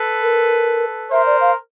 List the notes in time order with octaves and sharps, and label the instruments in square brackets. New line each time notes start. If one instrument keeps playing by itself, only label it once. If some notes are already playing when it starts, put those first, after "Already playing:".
Already playing: [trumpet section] A4 B4
[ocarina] A#4
[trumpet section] A#4 C5 [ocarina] E5
[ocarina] D5
F5